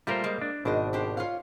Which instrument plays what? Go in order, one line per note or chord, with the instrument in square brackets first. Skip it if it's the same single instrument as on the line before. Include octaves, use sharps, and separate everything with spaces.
[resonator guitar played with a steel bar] A#2 A3 F4 [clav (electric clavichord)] G3 A#4 C5
[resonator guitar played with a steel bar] G#3 A#3
[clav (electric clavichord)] D4
[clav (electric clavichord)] G#1 B2 [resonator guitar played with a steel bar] D4 C5 D#5
[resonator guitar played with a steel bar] D4 G4 C5
F4 C#5 F5